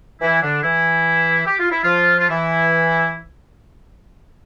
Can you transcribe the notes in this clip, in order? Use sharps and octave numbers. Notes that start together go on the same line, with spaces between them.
E3 E4
D3 D4
E3 E4
G4
F4
E4
F3 F4
F4
E3 E4